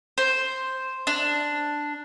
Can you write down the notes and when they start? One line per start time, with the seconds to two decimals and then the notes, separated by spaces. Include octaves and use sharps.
0.18 C5
1.07 D4